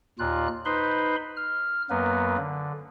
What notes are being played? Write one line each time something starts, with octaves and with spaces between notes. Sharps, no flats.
D#2 A#2 F4 F#6
D#4 B4 C5 B5 C6
F6
F#2 F#3 A#3 B3 B4
D3